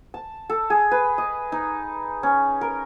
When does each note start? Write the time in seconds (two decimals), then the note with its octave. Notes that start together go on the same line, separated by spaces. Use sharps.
0.14 A5
0.50 A4
0.70 G#4
0.91 B4
1.18 D#5
1.52 D#4
2.23 C#4
2.61 A#4